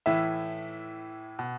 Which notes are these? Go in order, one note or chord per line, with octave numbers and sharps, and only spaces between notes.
A2 E3 E5
B2